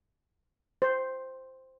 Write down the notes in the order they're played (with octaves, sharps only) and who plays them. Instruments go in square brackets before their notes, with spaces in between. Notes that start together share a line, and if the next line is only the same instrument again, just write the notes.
[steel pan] C5